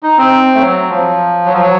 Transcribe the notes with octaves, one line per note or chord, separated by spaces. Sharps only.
D#4
C4
A3
F#3
F3
F#3
F3
F#3